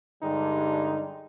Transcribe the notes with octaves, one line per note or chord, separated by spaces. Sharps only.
G2 D3 G3 G#3 D#4